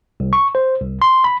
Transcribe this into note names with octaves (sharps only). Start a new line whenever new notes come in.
C2
C#6
C5
C2
C6
B5